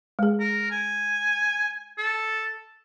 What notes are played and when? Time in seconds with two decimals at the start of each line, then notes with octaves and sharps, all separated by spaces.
0.19 G#3 G#4
0.40 A#4
0.71 G#5
1.98 A4